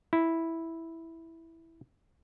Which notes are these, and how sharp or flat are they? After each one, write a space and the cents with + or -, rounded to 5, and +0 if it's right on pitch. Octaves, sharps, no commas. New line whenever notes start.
E4 -5